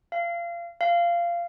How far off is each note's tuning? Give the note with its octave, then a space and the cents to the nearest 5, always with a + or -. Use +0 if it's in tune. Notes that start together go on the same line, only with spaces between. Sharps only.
F5 -30
F5 -20